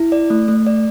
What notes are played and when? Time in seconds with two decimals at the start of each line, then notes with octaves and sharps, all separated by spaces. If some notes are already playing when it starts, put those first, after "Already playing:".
Already playing: E4
0.12 D5
0.30 A3
0.48 A3
0.67 D5